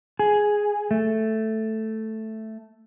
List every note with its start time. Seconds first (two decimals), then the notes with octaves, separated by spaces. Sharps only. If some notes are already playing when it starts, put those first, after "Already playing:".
0.19 G#4
0.91 A3